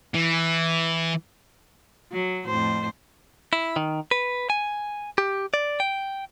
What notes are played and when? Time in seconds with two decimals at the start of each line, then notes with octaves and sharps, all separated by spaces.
0.14 E3
2.12 F#3
2.46 F2 A2 C5
3.53 E4
3.76 D#3
4.11 B4
4.50 G#5
5.18 G4
5.54 D5
5.80 G5